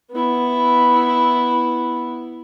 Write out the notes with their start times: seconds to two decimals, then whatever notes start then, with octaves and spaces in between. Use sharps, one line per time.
0.12 B3 E4